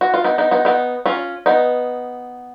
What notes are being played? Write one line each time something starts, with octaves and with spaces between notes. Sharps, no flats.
F#4
F4
B3 D#4
B3 D#4
B3 D#4
B3 D#4
C#4 F4
B3 D#4